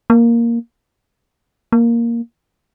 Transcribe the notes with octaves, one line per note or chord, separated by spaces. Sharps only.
A#3
A#3